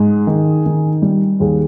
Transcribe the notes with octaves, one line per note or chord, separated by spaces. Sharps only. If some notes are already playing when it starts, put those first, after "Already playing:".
Already playing: G#2 G#4
D#3
D#3
G3
D#2 G#4